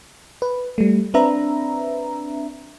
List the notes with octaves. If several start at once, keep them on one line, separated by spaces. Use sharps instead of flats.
B4
G3 A3
C4 D4 B4 E5 A#5